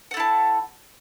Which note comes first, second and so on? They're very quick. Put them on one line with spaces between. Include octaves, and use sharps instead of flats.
F#5 A4 E4 A5